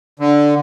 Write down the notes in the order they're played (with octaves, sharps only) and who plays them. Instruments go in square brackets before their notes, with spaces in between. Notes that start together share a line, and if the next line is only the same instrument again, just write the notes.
[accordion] D3